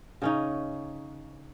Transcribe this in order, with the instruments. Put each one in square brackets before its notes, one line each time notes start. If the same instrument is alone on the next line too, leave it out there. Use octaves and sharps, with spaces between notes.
[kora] C#3 C#4 D#4